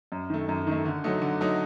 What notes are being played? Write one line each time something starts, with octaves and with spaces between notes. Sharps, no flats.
F#2
D#3 A3
F#2
D#3 A3
D3
F#3 A3 D#4
D3
F#3 A3 D#4